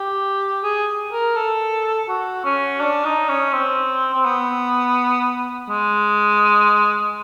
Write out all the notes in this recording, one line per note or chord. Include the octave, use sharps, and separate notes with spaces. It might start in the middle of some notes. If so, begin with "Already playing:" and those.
Already playing: G4
G#4
A#4
A4
F#4
C#4
D4
D#4
C#4
C4
C4
B3
G#3